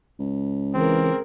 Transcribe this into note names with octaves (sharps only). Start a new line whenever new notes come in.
C#2
E3 C4 G#4 A#4